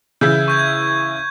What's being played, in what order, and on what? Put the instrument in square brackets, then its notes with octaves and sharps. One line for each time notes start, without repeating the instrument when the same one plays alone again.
[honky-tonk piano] C#3 E3 E4 [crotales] G6
[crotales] C#6 G6 G#6
G#6
G6